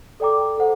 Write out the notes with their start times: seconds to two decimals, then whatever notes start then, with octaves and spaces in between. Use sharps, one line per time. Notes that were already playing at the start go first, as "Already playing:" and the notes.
0.20 A4 D5 G5 A#5 D6
0.58 A4 C5 F#5